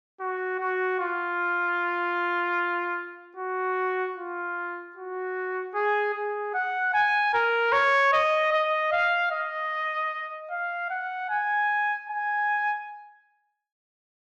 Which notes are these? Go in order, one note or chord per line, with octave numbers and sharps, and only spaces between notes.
F#4
F#4
F4
F#4
F4
F#4
G#4
G#4
F#5
G#5
A#4
C#5
D#5
D#5
F5
D#5
F5
F#5
G#5
G#5